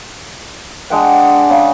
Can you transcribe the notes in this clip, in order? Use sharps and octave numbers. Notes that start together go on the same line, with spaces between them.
G#3 D4 F#5 G5
C#3